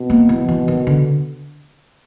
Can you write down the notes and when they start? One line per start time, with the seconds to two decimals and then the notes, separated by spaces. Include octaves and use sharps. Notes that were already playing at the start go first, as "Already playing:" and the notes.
Already playing: B2
0.10 A#3
0.29 E3
0.48 E3
0.68 D#3
0.87 D3